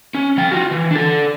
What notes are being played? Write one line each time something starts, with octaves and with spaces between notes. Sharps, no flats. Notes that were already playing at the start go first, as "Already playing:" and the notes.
C#4
F3 G5
F4 F#4
E3
D4 A4